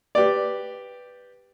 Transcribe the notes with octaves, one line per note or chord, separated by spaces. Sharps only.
G4 B4 D5